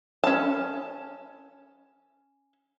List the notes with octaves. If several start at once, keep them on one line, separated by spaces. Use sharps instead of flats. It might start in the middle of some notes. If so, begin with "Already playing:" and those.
C#4 A5